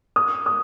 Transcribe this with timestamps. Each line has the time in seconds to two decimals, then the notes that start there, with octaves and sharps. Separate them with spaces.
0.16 D#6
0.46 D#6